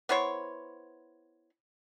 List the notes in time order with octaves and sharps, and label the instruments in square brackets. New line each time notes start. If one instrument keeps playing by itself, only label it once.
[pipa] B3 E4 C5 C#5